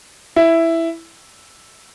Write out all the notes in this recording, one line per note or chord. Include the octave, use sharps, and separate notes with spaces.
E4